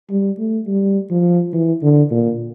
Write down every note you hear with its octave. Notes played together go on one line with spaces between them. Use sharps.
G3
A3
G3
F3
E3
D3
A#2